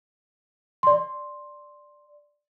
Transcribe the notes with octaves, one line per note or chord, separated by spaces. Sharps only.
D5 C6